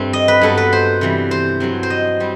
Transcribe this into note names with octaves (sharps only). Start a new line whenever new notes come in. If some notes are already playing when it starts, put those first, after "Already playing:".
Already playing: G2 G3 A3 C4
D#5
B4
G2 F#3 B3 A4
B4
C5
C3 E3 G3
C5
G2 F#3 C4
C5
D#5
G3 C4